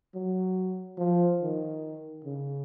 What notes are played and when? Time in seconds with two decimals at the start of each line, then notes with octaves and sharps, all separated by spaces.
0.14 F#3
0.98 F3
1.41 D#3
2.24 C#3